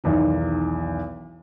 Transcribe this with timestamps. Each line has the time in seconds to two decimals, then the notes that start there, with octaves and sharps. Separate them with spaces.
0.04 B1 E2 D#3